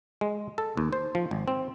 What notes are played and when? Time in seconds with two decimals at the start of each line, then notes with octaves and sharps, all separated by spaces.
0.21 G#3
0.58 A4
0.77 D#2
0.93 C5
1.15 F3
1.31 G#1
1.48 C4